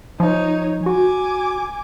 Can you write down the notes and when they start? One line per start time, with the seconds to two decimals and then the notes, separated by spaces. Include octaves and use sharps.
0.20 F3 D#4 C#5
0.86 F#4 G#5 D6